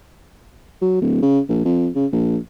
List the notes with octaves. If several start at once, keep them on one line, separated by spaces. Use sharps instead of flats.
F#3
D1
C#3
A#1
F2
C#3
A#1